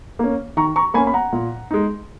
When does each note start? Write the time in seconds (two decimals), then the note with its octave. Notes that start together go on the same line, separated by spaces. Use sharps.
0.19 A#3 C#4
0.57 D#3 A#5 C#6
0.76 A#5 C#6
0.94 A#3 C#4 G#5 B5
1.07 B5
1.13 F#5 A#5
1.32 A#2
1.71 G#3 D#4